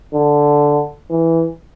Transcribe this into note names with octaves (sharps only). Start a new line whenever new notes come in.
D3
E3